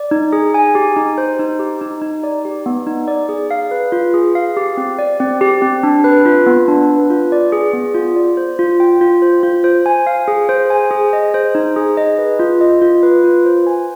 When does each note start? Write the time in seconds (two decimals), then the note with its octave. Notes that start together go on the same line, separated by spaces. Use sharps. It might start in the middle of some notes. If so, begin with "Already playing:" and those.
Already playing: D5
0.11 D#4
0.33 G#4
0.54 G#5
0.75 G4
0.96 D#4
1.18 C5
1.39 D#4
1.60 G4
1.81 D#4
2.02 D#4
2.23 D5
2.45 G4
2.66 B3
2.87 D#4
3.08 D5
3.29 G#4
3.51 F5
3.71 B4
3.92 F4
4.14 G#4
4.35 F5
4.57 G4
4.77 C4
4.99 D5
5.20 C4
5.41 G4
5.62 C4
5.83 D4
6.04 B4
6.25 F4
6.46 B3
6.68 D4
6.89 B4
7.10 F4
7.32 D5
7.52 G#4
7.73 B3
7.94 F4
8.16 D5
8.37 C5
8.59 F4
8.80 G5
9.01 F4
9.22 C5
9.43 F4
9.64 C5
9.86 G#5
10.07 F5
10.28 G#4
10.49 C5
10.70 G#5
10.91 G#4
11.13 D#5
11.34 C5
11.55 D#4
11.76 G#4
11.97 D#5
12.18 B4
12.40 F4
12.61 D#5
12.82 F4
13.03 B4
13.24 F4
13.45 C5
13.67 G#5